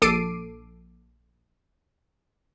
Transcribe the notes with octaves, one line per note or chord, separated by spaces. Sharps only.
A#1 A4 D6 C7 D7 D#7